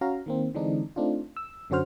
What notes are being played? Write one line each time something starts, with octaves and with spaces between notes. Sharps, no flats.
C#4 F#4 F5 A#5
D#3 A#3 C4
D3 E3 G#3 C4 D4 D#4
A3 C4 D4 D#4 F4
E6
F#2 D3 C#4 F#4 C5 F6